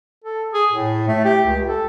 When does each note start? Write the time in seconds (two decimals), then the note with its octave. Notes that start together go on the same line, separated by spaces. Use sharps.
0.24 A4
0.54 G#4
0.72 A2
1.08 A3
1.25 G4
1.46 C#2
1.68 A4